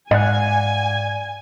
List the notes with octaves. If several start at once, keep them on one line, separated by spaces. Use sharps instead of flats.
G#2 D5 F5 F#5 G#5